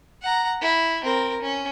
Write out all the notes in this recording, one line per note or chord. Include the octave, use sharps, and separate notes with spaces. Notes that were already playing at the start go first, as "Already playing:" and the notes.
F#5 A#5
E4
C4 A#4
C#4